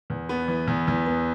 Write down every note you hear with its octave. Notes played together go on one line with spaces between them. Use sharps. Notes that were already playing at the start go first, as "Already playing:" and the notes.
E2
B3
E3
E2
E2
B3